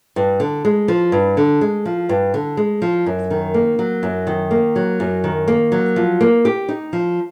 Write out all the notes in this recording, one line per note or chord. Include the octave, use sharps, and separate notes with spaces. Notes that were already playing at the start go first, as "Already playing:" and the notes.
G2
D3
G#3
F3
G2
D3
G#3
F3
G2
D3
G#3
F3
F#2
D#3
A#3
F#3
F#2
D#3
A#3
F#3
F#2
D#3
A#3
F#3
F3
A#3
G4
D#4
F3